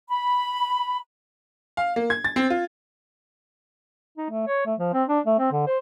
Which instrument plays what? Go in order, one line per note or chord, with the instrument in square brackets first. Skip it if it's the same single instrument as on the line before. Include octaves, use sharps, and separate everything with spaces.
[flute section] B5
[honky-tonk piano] F5
A#3
G#6
A6
C4
F4
[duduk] D#4
A3
C#5
A3
F3
C4
D4
A3
C4
D3
C5